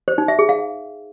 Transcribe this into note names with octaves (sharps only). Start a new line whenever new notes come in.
C5
D#4
E5
G#4
F5